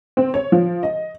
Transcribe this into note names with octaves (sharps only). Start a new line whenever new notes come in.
C4
C#5
F3
D#5